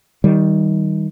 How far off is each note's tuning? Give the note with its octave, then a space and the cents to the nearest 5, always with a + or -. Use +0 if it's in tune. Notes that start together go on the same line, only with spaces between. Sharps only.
D#3 +15 G3 -10